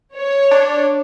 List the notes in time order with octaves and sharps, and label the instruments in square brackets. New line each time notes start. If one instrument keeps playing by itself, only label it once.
[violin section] C#5
[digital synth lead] D4